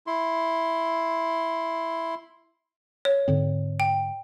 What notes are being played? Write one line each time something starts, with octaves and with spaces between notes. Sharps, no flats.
E4 C6
C#5
G#2 D3 C4
G5